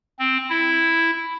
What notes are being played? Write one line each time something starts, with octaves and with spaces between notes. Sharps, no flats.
C4
E4